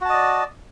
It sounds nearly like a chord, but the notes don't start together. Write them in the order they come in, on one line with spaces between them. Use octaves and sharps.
F#4 A5 D#5 D5